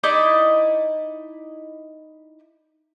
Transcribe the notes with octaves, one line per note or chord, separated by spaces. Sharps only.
D#4 E4 D5 D#5